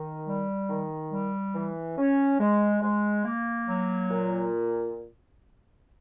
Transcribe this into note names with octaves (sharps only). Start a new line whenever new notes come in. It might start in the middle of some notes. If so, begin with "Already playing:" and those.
Already playing: D#3
G3
D#3
G3
E3
C#4
G#3
G#3
A#3
F#3
A#2